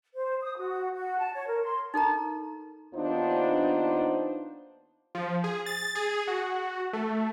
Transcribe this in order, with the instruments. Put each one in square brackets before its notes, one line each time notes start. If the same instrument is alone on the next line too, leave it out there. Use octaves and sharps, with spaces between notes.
[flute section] C5
D#6
F#4
F#4
A5
C#5
A#4
C6
[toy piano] D#4 A4 A#4 A#5
[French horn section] D#2 B3 D4 D#4 F4 C5
[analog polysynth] F3
G#4
A6
G#4
F#4
A3